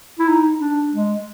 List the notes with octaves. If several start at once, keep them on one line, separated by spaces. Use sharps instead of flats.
E4
D#4
D4
G#3